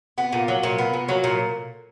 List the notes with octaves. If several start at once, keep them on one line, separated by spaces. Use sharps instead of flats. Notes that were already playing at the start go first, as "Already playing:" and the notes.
B3
A#2
F#3
A#2
B3
A#2
F#3
A#2